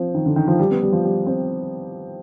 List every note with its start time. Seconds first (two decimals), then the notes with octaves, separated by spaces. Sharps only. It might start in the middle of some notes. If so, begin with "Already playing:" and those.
Already playing: F3 C4
0.14 D#3
0.26 D3
0.36 D#3
0.47 F3
0.59 G3
0.71 B3
0.82 G3
0.92 F3
1.04 G3
1.26 C4